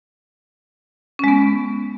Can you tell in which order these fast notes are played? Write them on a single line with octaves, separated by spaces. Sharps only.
C#4 G#3 B3